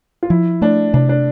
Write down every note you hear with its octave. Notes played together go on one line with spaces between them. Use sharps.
F4
F3 E4
A3 D4
C3 D4
D4